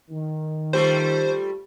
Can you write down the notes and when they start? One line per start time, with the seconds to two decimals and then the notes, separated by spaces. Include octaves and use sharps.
0.10 D#3
0.73 G3 A3 F4 C5